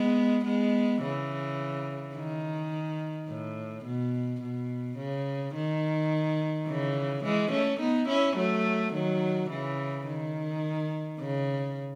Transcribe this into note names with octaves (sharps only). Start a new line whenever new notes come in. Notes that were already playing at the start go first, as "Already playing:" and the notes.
Already playing: G#3 B3
G#3 B3
C#3 E3
D#3
A2
B2
B2
C#3
D#3
C#3 E3
E3 G#3
A3 C#4
B3 D#4
C#4 E4
F#3 A3
D#3 F#3
C#3 E3
D#3
C#3